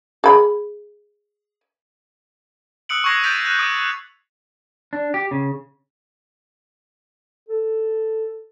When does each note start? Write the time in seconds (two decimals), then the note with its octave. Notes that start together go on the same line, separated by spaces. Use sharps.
0.24 G#4 B5
2.89 D#6 E6 F#6 C#7 D7 F#7
3.04 C#6 D6 F#6 G#6 A#6 C7
3.23 G6 A6 B6 D7 D#7 F7
3.45 F#6
3.59 D6 D#6 G6 D7 D#7
4.93 D4
5.14 G4
5.31 C#3
7.49 A4